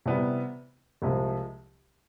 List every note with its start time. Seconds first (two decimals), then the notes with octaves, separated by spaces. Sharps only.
0.06 C3 E3 G3 B3
1.02 C2 C3 F3 G#3